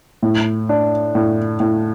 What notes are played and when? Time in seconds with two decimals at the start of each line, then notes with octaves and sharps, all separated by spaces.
0.23 A2
0.69 D4
1.15 A2
1.60 A2